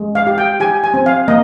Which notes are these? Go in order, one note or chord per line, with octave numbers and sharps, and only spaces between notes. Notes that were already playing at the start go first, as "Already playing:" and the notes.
Already playing: G#3
F5
G4
G5
G4 G#5
G#5
C4
F5
A#3 D#5